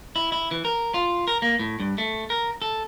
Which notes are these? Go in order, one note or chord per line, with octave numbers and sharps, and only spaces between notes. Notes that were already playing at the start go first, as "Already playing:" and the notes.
E4
E4
E3
A#4
F4
A#4
A#3
A2
G2
A3
A#4
A4